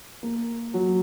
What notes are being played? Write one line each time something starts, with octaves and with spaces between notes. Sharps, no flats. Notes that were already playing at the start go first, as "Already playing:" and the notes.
A#3
F#3